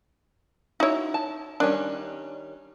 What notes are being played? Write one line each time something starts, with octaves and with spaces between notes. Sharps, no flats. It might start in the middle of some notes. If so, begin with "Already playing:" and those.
D#4 E4 F#4 C#5
A5
D#3 G3 C#4 D4